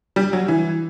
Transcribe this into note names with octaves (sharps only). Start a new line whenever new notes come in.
G3
F#3
E3